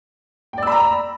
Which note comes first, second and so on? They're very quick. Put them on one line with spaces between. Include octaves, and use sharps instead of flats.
G5 D5 E6 B5 A#5